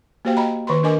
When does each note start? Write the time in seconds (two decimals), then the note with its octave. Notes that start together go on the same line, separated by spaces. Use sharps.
0.25 A#3 F#4 G4 C5 F5 G5
0.37 D#5 G5 A#5 B5
0.67 D#3 B4 B5 C6
0.83 D4 A#4 D#5 G#5 D6